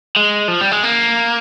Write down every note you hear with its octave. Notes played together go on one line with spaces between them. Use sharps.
G#3
F3
G3
G#3
A#3